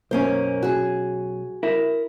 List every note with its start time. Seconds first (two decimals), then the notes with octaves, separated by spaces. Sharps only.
0.11 B1 F#2 A#3 C#4 C5
0.63 F#4 G#4
1.63 E4 A#4 E5